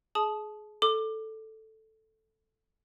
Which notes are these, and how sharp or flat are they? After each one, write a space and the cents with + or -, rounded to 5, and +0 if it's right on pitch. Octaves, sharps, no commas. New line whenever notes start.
G#4 +25 A5 -25 D#6 +0
A4 +0 D6 +20